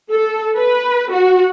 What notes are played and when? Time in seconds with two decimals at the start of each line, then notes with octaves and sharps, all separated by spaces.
0.11 A4
0.58 B4
1.13 F#4